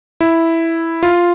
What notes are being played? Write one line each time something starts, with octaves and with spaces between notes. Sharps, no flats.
E4
F4